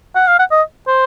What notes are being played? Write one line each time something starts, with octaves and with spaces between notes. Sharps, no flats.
F#5
F5
F#5
D#5
C5